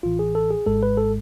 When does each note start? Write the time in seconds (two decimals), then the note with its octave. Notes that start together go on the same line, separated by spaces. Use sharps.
0.03 A1 A2 E3 F4
0.19 G#4
0.35 A4
0.51 G#4
0.66 G#1 G#2 G#3 A4
0.83 B4
0.97 A4